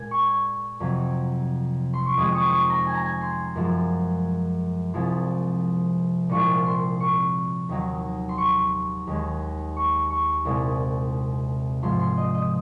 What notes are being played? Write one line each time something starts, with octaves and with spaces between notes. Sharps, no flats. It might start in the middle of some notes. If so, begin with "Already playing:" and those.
Already playing: A#2 G#3 G#5
C#6
F2 C3 F#3
C6
C#6
F2 D#3 G#3 D#6
D#6
C#6
C#6
A#5
G#5
A#5
G#5
C6
F#2 F3 G#3
C2 C3 F3 G#3
C2 A#2 F3 G#3 C#6
C6
C#6
D#2 D#3 F#3
C6
C#6
D#2 D#3 G#3
C#6
C#6
C2 A#2 G#3
G#2 F3 G#3 C6
C6
D#5
D#5